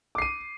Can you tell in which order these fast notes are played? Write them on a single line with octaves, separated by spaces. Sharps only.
D6 C7 D#7